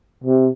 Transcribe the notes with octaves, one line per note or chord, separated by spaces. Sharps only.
C3